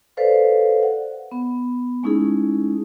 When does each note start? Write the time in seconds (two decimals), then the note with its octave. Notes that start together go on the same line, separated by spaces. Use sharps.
0.17 A4 B4 C5 D5 F5
0.83 F#5
1.31 B3
2.03 G#3 A3 C#4 D#4 E4 G#4